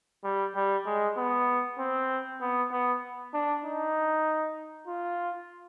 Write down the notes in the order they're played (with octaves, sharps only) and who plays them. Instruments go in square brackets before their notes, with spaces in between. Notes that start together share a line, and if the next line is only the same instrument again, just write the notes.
[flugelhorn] G3
G3
G#3
B3
C4
B3
B3
D4
D#4
F4